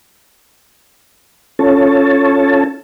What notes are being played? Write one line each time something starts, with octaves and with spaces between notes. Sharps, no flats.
C#4 F4 A4 C#5 A5